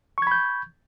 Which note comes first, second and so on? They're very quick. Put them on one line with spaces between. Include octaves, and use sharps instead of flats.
C#6 G#6 B5 G6